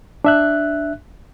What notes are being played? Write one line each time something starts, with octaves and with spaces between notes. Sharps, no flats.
D4 E5 F#6